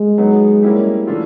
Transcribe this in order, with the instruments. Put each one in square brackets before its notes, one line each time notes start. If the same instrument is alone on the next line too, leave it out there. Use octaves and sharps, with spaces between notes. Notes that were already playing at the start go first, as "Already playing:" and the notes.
Already playing: [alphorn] G#3
[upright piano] F#3 B3 D#4
G3 A#3 C#4 E4 G4
E3 A3 D4 F4